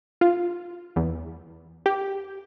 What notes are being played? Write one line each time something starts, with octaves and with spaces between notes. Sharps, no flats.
F4
E2
G4